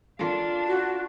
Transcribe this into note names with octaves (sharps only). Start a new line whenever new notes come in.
D4 F4 A4 A#4 F5
F#4